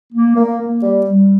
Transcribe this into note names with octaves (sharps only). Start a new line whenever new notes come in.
A#3
A#3
A#3
G3
G3